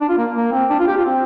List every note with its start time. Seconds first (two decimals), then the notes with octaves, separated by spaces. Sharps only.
0.01 D4
0.09 F4
0.18 A#3
0.36 A#3
0.52 C4
0.70 D4
0.79 F4
0.88 G4
0.97 F4
1.05 C4